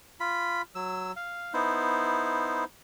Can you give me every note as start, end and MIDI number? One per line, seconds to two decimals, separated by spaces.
0.20 0.62 65
0.20 0.62 83
0.75 1.12 54
0.75 1.12 88
1.16 1.53 77
1.54 2.64 59
1.54 2.64 63
1.54 2.64 64
1.54 2.64 72